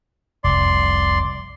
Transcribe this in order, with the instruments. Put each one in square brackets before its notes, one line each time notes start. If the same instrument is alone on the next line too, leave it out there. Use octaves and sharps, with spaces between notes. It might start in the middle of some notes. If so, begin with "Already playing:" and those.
[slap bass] F1 C2 [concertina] D5 C6